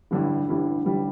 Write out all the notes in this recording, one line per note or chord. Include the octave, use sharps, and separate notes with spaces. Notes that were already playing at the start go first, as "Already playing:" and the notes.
A1 G2 D3 G3 E4
A1 G2 D3 G3 E4
A1 G2 D3 G3 E4